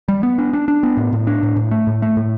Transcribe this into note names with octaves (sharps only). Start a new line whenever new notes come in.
G3
B3
D4
D4
D4
B3
A2
A2
D4
A2
A2
A3
A2
A3
A2